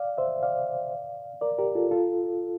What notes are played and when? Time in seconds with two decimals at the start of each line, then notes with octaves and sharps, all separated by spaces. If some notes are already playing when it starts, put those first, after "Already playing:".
Already playing: D5 F5
0.18 C5 E5
0.43 D5 F5
1.41 A#4 D5
1.58 G4 A#4
1.75 F4 A4
1.91 F4 A4